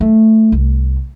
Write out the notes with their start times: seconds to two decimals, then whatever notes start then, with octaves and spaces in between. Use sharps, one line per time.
0.01 A3
0.52 C2